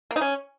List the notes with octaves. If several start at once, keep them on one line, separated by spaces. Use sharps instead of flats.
A#3
D#4
C#4